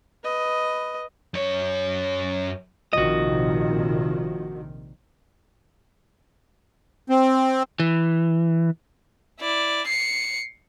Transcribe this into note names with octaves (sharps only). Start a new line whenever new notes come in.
B4 D#5
F#2 C#5
A#1 C3 D#3 F3 F#4 D#5
C4
E3
E4 D5
C7 C#7